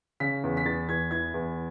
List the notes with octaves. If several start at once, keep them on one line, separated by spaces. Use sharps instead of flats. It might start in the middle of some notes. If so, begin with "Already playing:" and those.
C#3 B6
E2
B6
E2 A6
E2 G#6
E3 G#6
E2